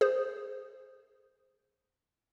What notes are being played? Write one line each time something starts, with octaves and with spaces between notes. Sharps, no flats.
G#4 C5